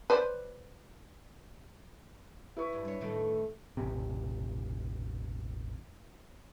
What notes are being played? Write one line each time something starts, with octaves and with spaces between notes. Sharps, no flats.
B4 C5 D5
E4 B4 C#6
G2
G2 C#5
A2 D#3 A3
E1 A1 C3